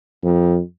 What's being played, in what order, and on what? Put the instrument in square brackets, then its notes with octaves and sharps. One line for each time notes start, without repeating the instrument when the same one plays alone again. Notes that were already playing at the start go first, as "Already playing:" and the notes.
[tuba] F2